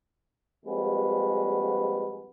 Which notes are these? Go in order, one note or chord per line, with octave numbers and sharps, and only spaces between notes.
A#1 F2 G3 G#3 F#4 B4